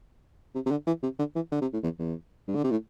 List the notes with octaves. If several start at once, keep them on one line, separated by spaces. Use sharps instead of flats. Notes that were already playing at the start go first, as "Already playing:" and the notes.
C3
C3
D3
E3
C3
D3
E3
D3
C3
A2
E2
E2
G2
D3
C3
A2